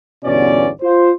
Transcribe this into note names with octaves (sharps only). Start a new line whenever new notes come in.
G1 E2 B2 C#4 D5
F4 C5